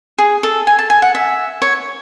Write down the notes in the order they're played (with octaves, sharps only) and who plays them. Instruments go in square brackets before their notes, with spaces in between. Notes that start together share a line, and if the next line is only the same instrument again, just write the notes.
[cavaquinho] G#4
A4
G#5
A5
G#5
F#5
E5
C#5